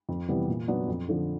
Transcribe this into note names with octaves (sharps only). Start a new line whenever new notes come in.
F2
C3 E3 G3 B3
A#2
F#3 B3 D4
F2
D3 F3